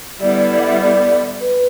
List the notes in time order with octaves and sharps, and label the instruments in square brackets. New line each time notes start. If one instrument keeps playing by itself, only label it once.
[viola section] D3 G3 B3 E4 [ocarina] D5
[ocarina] D5
D5
F#5
E5
D5
B4